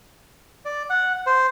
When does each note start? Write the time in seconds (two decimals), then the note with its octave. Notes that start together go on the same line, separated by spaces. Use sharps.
0.65 D5
0.90 F#5
1.26 C5